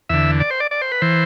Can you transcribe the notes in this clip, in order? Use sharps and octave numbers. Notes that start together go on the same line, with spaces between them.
E2 D3 E5
D5
C5
D5
D5
C5
B4
E3 C5